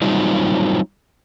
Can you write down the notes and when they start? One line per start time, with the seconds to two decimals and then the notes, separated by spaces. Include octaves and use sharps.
0.02 F#3 G3 C4 D#4 F4